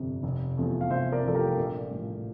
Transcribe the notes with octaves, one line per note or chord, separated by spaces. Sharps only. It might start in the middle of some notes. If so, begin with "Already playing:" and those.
Already playing: G1 F2 C3
F1
E2 C3 F3 A3
F5
F1 C5 E5
A#4 D5
E2 C3 F3 A3 A4
G4 A#4
A#1
A2 F3